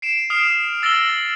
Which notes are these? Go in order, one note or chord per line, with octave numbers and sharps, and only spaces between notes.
C7 D7 E7
D#6 F6 C7 D7 F7
E6 A6 A#6 D7 F#7 G7